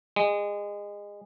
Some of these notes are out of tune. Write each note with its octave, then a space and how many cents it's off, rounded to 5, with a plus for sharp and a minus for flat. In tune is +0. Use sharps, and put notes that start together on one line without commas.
G#3 -25